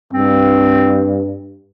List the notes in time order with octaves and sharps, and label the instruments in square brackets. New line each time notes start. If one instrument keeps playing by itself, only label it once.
[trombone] G2 [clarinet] C4